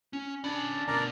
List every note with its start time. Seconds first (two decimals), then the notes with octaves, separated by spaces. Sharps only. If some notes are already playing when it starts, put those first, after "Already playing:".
0.13 C#4
0.44 C#4 D4 B5
0.88 D2 B2 A#4 D5 A#5